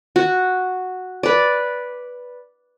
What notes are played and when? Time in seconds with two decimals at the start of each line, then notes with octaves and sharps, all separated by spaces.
0.16 F#4
1.23 B4 D5